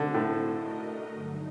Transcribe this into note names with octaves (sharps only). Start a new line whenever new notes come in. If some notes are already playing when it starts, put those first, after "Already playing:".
Already playing: D3 A3 C4 F#4 A4 C5
A2
A3 D4 F#4 A#4 D#5
G2 D3 F#3 A3 D#4